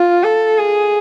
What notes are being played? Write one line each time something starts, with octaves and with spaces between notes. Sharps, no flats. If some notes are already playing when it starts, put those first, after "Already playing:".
Already playing: F4
A4
G#4